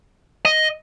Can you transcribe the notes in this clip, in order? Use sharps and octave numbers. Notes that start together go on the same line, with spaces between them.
D#5